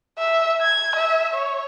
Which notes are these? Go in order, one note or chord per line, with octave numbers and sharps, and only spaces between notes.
E5
G#6
E5
C#5